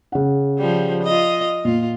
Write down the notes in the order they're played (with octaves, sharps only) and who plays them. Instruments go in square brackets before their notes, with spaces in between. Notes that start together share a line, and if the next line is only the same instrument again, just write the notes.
[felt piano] C#3 F#5
[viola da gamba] F3 G3
F4 D#5
[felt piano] A#2 [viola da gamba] F4